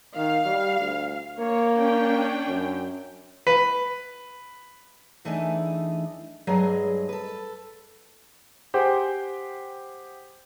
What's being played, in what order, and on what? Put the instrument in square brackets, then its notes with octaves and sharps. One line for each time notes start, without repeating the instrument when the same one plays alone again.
[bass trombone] D#3 [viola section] F5
[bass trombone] G3
D2
[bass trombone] A#3 [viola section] C#5
[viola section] C#4 D4 G5
[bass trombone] F#2
[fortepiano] B4
[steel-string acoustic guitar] E2 E3 A3 D4 D#4 G#5
G2 F#3 G#3 G#4 D#5
A4 B4
[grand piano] G4 G#4 C5 F#5 G5